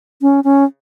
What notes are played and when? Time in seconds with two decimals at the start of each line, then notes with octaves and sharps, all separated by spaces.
0.22 C#4
0.44 C#4